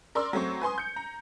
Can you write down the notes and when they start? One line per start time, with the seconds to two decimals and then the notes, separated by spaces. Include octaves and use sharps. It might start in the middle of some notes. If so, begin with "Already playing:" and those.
0.15 A#4 D5 C6 E6
0.33 F#3 A3 C4 C#6
0.61 B4 G#5 C6 D#6
0.78 G6 C#7
0.96 A#5